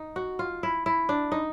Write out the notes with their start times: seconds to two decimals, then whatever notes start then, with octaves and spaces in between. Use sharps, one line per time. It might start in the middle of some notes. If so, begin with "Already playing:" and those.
Already playing: D#4
0.16 F#4
0.39 F4
0.63 E4
0.86 E4
1.09 D4
1.32 D#4